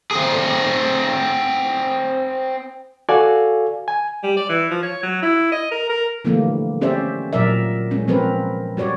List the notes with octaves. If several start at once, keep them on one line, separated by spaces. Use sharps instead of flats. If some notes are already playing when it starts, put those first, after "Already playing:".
C4 G#4
F#4 A4 D5 F5 G#5
G#5
G3
D5
E3
F3
C#5
F#3
E4
D#5
A#4
A#4
D3 E3 F3 G3 A3 A#3
C4 C#4 G4 C5 D5 E5
A#2 F#3 A#4 D5 E5
G#3 C#4
F3 C4 A#4 B4
G3 F#4 C#5 D5